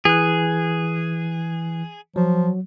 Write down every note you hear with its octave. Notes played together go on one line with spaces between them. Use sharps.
E3 G#4 F#6
F3 F#3